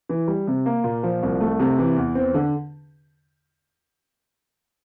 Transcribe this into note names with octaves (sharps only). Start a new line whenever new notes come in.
E3
G3
C3
A#3
A#2
F3
C2
A3
C3
E3
E2
C4
D3